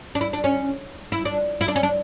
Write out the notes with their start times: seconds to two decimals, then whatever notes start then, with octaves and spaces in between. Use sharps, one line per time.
0.15 D4
0.21 E4
0.33 D4
0.44 C#4
1.12 E4
1.25 D4
1.61 E4
1.68 D4
1.76 C#4
1.83 D4